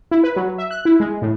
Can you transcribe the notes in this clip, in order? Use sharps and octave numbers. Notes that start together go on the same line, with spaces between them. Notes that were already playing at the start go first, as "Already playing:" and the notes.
E4
B4
F#3
E5
F#6
E4
G#3
A2